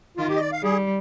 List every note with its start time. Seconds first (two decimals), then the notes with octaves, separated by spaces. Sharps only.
0.17 D#3 F4
0.29 G4
0.36 D#5
0.40 D5
0.52 F5
0.63 G3 G#4